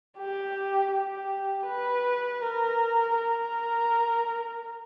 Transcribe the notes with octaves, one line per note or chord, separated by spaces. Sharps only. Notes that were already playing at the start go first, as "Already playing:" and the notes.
G4
G4
B4
A#4
A#4